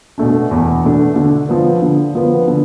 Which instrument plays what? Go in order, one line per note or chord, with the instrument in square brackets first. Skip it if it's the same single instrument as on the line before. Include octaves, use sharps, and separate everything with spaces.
[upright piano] B2 A3 D4
E2
B2 A3 D4
D3
F3 B3
D3
F3 B3
D3